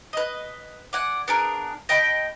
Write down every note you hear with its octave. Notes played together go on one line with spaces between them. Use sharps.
B4 D#5
D5 F#5 G#5
B3 D4 G#4 A#4
D#5 G5 A5 B5